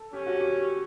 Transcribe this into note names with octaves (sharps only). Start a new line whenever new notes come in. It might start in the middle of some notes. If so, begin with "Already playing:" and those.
Already playing: A4
C#4 G4
F#4
G4